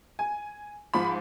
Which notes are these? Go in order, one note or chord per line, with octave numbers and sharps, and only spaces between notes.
G#5
G#2 F3 B5